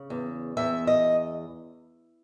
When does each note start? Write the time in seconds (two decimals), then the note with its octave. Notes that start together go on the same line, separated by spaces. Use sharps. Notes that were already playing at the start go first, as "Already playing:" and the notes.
Already playing: C#3
0.10 E2
0.57 E2 E5
0.87 D#5